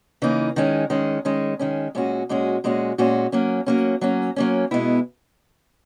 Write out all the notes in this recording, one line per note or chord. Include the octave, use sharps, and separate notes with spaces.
C#3 E3 A#3 D#4
D#3 G#3 C#4
D#3 G#3 C#4
D#3 G#3 C#4
D#3 G#3 C#4
A#2 G#3 C#4 F#4
A#2 G#3 C#4 F#4
A#2 G#3 C#4 F#4
A#2 G#3 C#4 F#4
F#3 A#3 C#4
F#3 A#3 C#4
F#3 A#3 C#4
F#3 A#3 C#4
B2 G#3 B3 E4